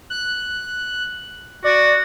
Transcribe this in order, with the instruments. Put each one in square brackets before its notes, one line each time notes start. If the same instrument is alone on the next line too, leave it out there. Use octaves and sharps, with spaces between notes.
[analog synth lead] F#6
[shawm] F#4 [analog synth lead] D5